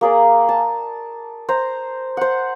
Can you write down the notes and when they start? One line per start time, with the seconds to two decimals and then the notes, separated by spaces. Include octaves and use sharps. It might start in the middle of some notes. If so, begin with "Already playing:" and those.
0.01 A#3 G#4 D5
0.49 A5
1.49 C5 A#5
2.17 C5 F#5